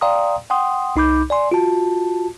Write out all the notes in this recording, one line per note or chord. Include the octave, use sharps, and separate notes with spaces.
D5 F5 G5 A#5 C6 D#6
F#5 G5 C6 D#6
C2 D#4 B5 D6 G6
D5 G#5 C6
F4 F#4 A5